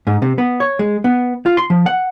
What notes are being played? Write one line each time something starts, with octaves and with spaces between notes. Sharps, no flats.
G#2
C3
B3
C#5
G#3
B3
F4
C6
F3
F#5